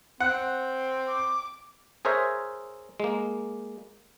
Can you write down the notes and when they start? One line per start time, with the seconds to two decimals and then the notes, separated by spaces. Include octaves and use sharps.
0.20 C4 F#5
1.08 D6
2.05 G#4 A#4 C5 C#5 E5
3.00 G#3 A#3